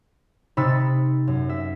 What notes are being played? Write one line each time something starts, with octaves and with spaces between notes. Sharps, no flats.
C3 D#4 B5 E6 A6 C#7
F#2
E5